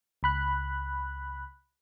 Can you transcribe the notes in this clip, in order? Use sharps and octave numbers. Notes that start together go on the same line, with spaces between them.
C#2 B5 F#6